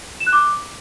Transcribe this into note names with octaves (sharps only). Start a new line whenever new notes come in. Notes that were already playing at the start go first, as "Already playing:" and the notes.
E7
F#6
D6